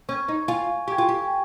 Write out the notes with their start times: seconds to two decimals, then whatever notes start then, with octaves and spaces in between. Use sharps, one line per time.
0.09 C#4 C#6
0.12 G#6
0.28 D#4
0.48 F4 G#5
0.87 G4 C#6 G#6
0.98 F4
1.09 G4
1.28 G#5